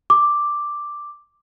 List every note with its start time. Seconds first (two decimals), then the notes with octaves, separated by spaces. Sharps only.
0.10 D6